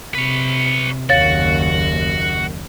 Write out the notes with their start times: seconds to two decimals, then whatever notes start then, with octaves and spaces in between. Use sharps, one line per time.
0.15 C3 B4 C#5
1.09 F#1 D#2 F#4 C#5 F5 A6